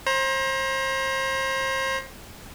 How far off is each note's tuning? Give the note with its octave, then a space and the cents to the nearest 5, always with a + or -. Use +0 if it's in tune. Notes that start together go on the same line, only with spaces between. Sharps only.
C5 +30 A#5 +30